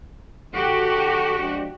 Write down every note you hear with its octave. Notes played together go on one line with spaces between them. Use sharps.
D3 F#4 G4 A4
F3 G#3 D4